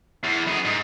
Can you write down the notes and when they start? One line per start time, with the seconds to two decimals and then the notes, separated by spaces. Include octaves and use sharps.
0.23 E2
0.47 F#2 G#4
0.65 G#2